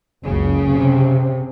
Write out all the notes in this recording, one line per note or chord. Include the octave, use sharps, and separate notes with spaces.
F#1 C#2 C#3
C3